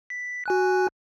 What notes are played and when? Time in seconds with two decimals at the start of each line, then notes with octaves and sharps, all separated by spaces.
0.10 B6
0.46 F#4 G#5 F#6